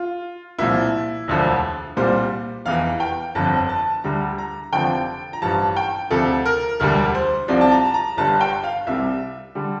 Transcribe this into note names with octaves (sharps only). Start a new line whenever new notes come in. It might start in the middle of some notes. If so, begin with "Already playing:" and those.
Already playing: F4
C2 A#2 F3 E4
E1 D2 D3 F3
C2 A#2 G3 C5
F1 E2 E3 F5
G5
G1 F2 D3 F3 A5
A5
D2 D3 G3 A#5
A#5
F1 F2 D3 F3 G5
A#5
A1 G2 F3 A5
G5
D2 C3 F3 A4
A#4
E1 D2 D3 G3 A#4
C5
C2 C3 F3 D5
A5
A#5
A5
A#5
G1 G2 D3 A5
G5
F5
C2 C3 G3 E5
D3 G3